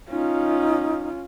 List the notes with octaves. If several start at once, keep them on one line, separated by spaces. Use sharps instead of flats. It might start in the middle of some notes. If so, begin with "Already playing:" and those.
C#4 D#4 F4